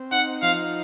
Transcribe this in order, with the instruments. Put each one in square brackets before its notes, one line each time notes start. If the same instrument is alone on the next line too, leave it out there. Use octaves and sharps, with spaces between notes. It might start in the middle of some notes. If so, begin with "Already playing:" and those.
Already playing: [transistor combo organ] C4
[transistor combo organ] D#4 [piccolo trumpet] F#5
[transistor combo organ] F3 [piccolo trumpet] F5